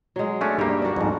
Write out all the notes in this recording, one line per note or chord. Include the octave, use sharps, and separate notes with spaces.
F#3 G#3
A3 C#4 D4
G2 A#3 G4
D4 F#4
F2 G#2